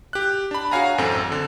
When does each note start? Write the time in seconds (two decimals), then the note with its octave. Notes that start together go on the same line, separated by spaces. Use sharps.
0.13 G4 F#6
0.51 D4 B5
0.71 F#4 G#4 C#5 F5 G#5 A#5
0.98 A1 F#2 C4 A4
1.32 D3